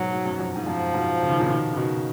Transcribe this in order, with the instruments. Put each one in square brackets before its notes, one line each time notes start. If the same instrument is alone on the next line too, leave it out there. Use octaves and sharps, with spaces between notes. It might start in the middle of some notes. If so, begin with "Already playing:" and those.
Already playing: [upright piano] G#2 B2 [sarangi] F#3
[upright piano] G#2
F#2
F2
G#2
[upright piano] F#2 [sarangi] F3
[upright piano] G#2 B2
C#3
D#3
A#2 C#3
B2 D#3
C#3
B2 D#3